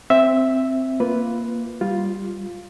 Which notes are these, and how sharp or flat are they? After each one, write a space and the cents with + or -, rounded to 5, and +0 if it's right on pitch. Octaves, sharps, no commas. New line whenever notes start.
C4 +0 E5 +0
A#3 +5 F4 +0 B4 +0
G3 +0 F4 +5